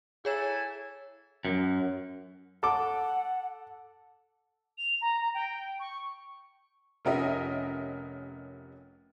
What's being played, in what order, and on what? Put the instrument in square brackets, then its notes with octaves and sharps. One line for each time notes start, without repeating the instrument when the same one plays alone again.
[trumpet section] E4 A4 G#5 [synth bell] G#4 C#5 E7
[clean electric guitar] F#2
[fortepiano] A4 D6 [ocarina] F#5
[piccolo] F7
A#5
A#5
G5
C#6
[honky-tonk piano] F1 C3 C#4 A#4 D#5 E5